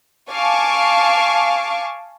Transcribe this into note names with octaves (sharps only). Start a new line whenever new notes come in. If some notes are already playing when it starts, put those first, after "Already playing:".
F5 G#5 A5 C#6 D6